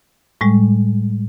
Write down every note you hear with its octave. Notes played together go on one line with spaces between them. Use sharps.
A2 G3 G#3